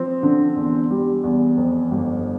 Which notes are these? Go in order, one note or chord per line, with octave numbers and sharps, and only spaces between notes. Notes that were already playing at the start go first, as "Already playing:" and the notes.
Already playing: F3 C4
D3
E2
G3
E2
F2
G1